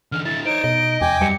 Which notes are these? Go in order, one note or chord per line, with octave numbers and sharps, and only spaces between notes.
D3 E3 F6
D3 E4 A6
D#4 C5 C#5 D7
B2 D#5
E2 G5 G#5 D6
F#2 G3 C#7